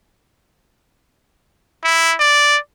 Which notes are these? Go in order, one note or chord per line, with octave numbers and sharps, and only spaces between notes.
E4
D5